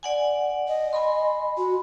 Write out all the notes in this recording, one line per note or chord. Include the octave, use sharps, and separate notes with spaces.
D5 F#5 G#5
D#5
G#5 B5 C6
F#4